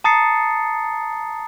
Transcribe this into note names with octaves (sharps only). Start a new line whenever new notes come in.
A5 A#5 D#6 A6 C7 C#7